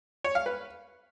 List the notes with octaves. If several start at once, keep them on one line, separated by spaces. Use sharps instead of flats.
C#5
F5
B4